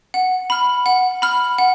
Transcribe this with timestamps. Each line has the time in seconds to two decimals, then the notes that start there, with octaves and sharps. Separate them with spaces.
0.14 F#5
0.50 B5 F6
0.86 F#5
1.22 B5 F6
1.58 F#5